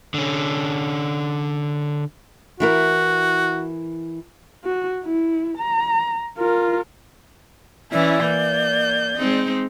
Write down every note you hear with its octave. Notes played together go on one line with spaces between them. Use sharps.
D3 C#4
E3 E4 F#4 A#4
F#4
E4
A#5
F4 A#4
E3 C#4 E4 D5
A#3 G6
G#3 C4 D#4